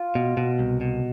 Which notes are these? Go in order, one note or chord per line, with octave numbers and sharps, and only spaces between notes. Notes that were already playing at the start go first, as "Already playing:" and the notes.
Already playing: F4
B2
B2
C2
B2